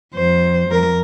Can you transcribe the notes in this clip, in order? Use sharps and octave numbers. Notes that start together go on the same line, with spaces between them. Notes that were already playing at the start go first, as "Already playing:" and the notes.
F2 C5
F2 A#4